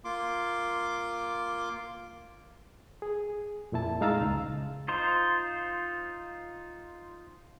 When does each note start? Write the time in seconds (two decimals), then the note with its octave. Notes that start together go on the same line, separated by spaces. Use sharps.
0.05 A#3 F4 C6 D6
3.02 G#4
3.72 F2 A#2 E4 A5
4.01 G#3 D#4 F5 A#5 E6 A6
4.21 C#2
4.88 D#4 F4 C5